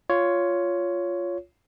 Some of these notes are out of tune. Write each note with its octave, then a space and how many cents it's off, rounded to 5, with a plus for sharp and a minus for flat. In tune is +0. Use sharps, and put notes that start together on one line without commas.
F4 +0 C#5 +10